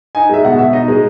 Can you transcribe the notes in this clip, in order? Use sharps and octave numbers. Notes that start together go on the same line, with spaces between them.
D#4 G#5
G#3 E5
B2 F#5
B2 E5
D#4 D#5
G#3